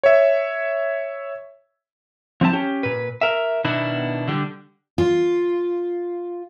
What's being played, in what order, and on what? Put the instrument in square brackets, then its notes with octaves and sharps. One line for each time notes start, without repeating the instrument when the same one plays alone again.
[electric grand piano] C#5 E5
[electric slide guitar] F3 C4 E4 A5
C#4 G4
A#2 B4
A#4 E5
B2 D#3 B3 D4 E4
D3 G3
[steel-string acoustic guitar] F4